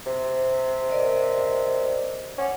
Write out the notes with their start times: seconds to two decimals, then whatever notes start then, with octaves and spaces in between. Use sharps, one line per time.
0.07 C3
0.90 A#4 D5 D#5
2.38 C#4 F#5 D6